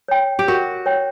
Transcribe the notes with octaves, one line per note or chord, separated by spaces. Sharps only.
C#5 G5
G4
F#4 A#4
C#5 G5